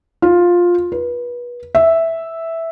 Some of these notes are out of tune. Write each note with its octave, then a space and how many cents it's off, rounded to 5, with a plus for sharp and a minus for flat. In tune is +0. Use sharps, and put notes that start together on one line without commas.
F4 +10
B4 -30
E5 -5